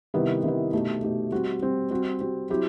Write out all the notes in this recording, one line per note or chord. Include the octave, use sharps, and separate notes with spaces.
C3 D#3 G3 B3 E4
C3 D#3 G3 B3 E4
B2 A3 D#4 G4
B2 A3 D#4 G4
G3 C4 F#4
G3 C4 F#4
G3 C4 F#4
G3 C4 F#4
F#3 C4 E4 G4